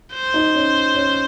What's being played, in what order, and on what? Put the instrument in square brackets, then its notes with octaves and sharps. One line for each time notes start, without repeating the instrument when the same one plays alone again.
[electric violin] C5
[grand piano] D#4
C#4
C#4